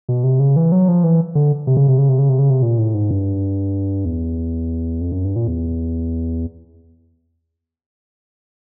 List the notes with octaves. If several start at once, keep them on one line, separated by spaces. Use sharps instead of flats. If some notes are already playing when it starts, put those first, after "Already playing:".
B2
C3
C#3
E3
F#3
F3
E3
D3
C3
C#3
C3
C#3
C3
C#3
C3
C#3
C3
A#2
A2
G#2
G2
E2
F2
F#2
G2
A#2
E2